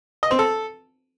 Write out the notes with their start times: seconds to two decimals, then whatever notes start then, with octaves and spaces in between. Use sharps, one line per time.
0.23 D#5
0.31 C4
0.39 A4